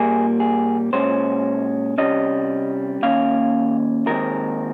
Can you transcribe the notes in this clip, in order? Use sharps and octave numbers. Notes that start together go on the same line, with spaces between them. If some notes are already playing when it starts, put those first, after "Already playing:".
Already playing: A#2 G3 A#3 G#4
G#4
A#2 G#3 C#4 C5
C3 G3 C#4 D#5
D#2 D#3 A#3 C#4 F5
D#2 D#3 G#3 C4 A#4